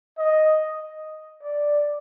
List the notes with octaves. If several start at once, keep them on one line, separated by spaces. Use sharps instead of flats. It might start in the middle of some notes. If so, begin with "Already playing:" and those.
D#5
D5